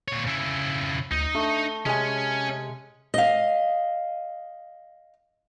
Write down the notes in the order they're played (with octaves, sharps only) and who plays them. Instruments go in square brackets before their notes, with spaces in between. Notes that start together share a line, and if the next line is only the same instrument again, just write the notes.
[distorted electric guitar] A#2 C#5
C#3 E4
[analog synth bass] D2 [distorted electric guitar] D#4
[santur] A3 [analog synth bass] D4
[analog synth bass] C3 [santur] G#3 G#5 [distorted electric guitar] C#4
[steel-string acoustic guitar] D#5 F5